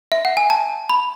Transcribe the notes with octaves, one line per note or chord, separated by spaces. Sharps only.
E5
F#5
G#5
A5
B5